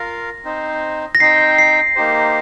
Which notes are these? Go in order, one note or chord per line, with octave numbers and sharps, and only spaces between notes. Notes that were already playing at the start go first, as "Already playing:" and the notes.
Already playing: F4 A#4 F5 A#6
C4 D#4 C5
A#6
C4 D#4 C5 G5 C7
A#6
C7
A#3 D#4 G4 C5